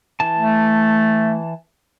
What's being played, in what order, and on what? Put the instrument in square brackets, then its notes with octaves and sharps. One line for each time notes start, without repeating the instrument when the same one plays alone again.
[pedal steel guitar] E3 A5
[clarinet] A3